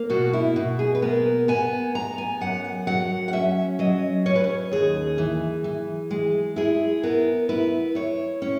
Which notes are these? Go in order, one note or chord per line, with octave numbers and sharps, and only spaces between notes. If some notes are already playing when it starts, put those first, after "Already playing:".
Already playing: A#3
B2 F#4
E4
B2
G#4
B4
B3 A#4
B3 G#5
B3 A#5
G#5
F#2 F#5
F#5
F#3 F#5
F#5
C#4 E5
F#3 D#5
C#4 C#5
B4
C#5
D#2 G#4
E3
E3
G#3
E4 G#4
B3 A#4
E4 B4
E4 C#5
C#4